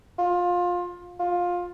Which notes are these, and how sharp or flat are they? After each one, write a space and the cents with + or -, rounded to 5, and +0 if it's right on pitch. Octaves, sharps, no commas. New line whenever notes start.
F4 +20
F4 +15